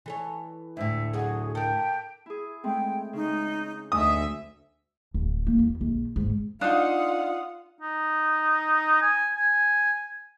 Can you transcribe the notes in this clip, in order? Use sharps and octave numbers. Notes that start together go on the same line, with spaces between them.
E3 A4 C#5
D2 A2 E5
F#3 F#4 G#4
A4 A#4 G5
E4 G#4
G#3 A3 C4 G5
C#3 G#3 D#4
D2 D#5 E5 G#5 D#6
D1
A#3
E2
A#1
G#2
D4 D#4 F4 F5 F#5 D#6
D#4
G#5
G#5